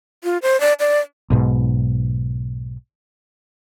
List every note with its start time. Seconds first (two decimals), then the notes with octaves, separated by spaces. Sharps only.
0.24 F4
0.42 C5
0.60 D5
0.80 D5
1.30 B1 G#2 B2